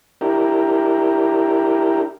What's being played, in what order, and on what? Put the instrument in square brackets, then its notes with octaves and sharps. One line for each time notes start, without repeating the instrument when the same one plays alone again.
[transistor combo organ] D4 E4 G4 A#4